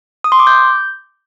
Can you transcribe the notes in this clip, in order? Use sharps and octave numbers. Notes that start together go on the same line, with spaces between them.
D#6
C6
D6
G6